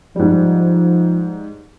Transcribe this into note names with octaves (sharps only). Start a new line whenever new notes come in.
G#2 F3 G3